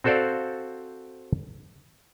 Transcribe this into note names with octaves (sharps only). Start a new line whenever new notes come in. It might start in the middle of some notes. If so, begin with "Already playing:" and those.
C4 F#4 A4 C5 D5 F5